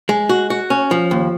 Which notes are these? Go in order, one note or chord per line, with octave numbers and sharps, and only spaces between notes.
G#3
F#4
F#4
C#4
F3
D#2